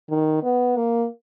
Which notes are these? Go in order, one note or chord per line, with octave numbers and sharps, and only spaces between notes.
D#3
B3
A#3